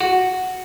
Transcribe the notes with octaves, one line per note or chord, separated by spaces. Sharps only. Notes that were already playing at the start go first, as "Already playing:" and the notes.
F#4